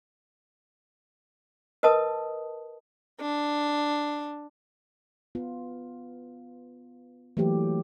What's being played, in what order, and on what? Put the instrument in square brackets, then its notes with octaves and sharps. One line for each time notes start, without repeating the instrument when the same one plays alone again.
[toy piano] A#4 B4 D#5 A5 D#6
[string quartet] D4
[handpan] B3 F4
E3 F#3 A3 A#3 G4